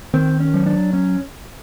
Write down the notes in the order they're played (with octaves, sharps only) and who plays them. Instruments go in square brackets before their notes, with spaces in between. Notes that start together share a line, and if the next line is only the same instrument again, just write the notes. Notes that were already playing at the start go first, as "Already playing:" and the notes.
[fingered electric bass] D#3 [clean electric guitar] C4
[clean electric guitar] C#4
[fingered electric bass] F#3
[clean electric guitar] D4
C#4